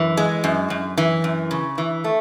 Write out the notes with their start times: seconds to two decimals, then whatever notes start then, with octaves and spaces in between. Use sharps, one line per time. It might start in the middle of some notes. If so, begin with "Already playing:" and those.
Already playing: F#2 E3
0.17 G#3
0.44 F#2
0.70 F#2
0.98 E3
1.24 F#2
1.51 C#3
1.78 E3
2.04 A3